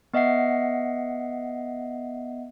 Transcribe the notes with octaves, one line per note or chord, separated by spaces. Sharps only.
B3 D#5 E5 F#5 C7